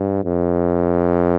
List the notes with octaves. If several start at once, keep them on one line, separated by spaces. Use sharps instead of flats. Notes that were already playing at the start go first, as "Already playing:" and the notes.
Already playing: G2
F2